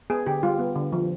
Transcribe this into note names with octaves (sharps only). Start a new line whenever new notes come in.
B3 G#4
D3 G4
G3 F4
B3
D3
F3